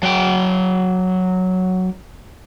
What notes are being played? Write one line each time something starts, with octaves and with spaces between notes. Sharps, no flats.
F#3 G5